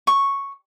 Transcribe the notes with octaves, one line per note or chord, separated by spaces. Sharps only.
C#6